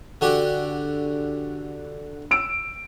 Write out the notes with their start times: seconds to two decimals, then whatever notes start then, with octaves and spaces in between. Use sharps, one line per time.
0.21 D3 F#4 G4
2.31 E6 D7